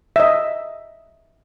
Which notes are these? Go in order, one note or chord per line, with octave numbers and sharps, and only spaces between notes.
D#5 E5